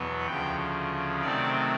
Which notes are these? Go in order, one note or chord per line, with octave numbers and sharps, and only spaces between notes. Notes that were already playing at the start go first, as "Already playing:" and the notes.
Already playing: E2 B2 F#3 B3
D2 C#3 F3 G5
C3 D#3 F#3 A3 C4 D5